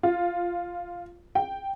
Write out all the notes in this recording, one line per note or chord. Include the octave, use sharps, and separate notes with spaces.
F4
G5